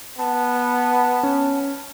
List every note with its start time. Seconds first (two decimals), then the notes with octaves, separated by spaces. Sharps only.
0.19 B3 A5
1.23 C#4